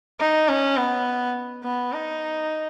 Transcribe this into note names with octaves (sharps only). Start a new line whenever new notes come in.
D#4
C#4
B3
B3
D#4